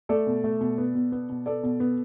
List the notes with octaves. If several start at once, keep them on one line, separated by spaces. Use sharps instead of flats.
A3 A4 D5
B2
A3
B2
B3
B2
B3
B2
B3 A4 D5
B2
B3